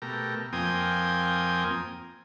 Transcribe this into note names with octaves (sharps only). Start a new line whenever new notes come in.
B2 A3 G4 A#4
F2 A#3 C4 G5 G#5 D#6